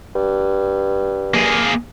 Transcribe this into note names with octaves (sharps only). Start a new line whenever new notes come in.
G2
A#3 G#4